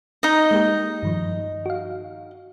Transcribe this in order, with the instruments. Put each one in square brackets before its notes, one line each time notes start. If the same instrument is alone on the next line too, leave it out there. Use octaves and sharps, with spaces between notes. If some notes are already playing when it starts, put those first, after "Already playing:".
[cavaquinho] D#4 D#5
[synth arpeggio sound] G#3 A#3 G4
G2 D#3 F3
F#4 F5